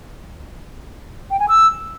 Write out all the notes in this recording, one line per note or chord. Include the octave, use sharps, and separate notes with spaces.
G5
G#5
E6